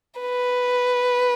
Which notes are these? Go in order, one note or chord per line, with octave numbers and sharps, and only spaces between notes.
B4